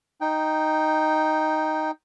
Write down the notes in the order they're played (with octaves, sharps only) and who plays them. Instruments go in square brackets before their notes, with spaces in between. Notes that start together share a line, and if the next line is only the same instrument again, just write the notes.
[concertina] D#4 G5